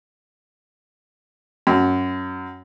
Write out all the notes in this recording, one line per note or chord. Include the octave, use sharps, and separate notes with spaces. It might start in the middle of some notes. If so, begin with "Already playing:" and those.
F#2